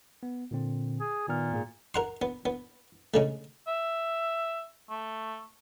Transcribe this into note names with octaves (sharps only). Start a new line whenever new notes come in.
B3
A#2 D3 C4
G#4
A#2 D#3 B3 F6
G#2 A#3 G#4
A#4 F#5 C6
B3
B3
C#3 G#3 A3
E5
A3